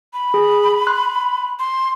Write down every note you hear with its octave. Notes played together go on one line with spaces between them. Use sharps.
B5
G#4
C6 F#6
C6